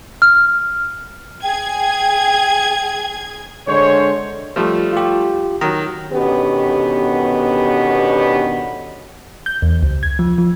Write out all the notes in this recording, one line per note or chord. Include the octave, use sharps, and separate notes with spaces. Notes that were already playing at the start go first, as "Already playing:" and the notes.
F6
G#4 G5 G#6
D3 G#3 C5 C#5
F3 G3 A3
F4 G4
D#3 F#3 A#5
B2 D3 D#3 B3 C#4 G4
G6
E2
C#2
G#6
F3
F3